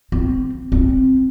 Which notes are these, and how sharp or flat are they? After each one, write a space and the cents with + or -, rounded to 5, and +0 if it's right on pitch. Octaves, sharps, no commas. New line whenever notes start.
C4 -15
C4 +0